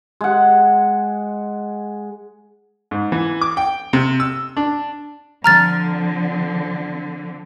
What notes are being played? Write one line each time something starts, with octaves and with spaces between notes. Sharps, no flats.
G#3 F#5
G#2
E3
D6
G5
C3
E6
D4
D3 F3 C4 A#5 F6 A6